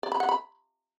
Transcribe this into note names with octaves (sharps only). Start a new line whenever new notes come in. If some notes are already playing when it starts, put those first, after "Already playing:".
D5
B5
F#5
B5